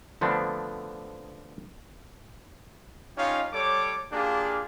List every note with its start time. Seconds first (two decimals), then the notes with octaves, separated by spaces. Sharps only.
0.21 D3 F3 A3 B3 C4 D4
3.17 C#4 D#4 F4 G4 C#5 F5
3.53 G3 A4 C#5 D6
4.11 A#3 D4 F4 G4 G#4